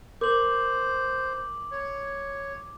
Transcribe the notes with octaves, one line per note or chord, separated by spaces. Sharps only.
A#4 C5 D6 F#7
C#5